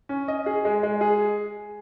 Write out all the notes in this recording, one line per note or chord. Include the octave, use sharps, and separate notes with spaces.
C#4
D#5
G#4
G#3
G#3
G#4